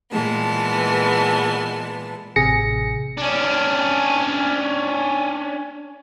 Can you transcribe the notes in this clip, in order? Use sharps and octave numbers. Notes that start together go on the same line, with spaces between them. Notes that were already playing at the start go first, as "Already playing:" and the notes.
A#2 E3 G#3 B3 A5
A1 C3 G#4 A#6 C#7
C#4 D4